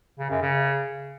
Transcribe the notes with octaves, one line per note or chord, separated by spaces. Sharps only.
C#3
F#2
C#3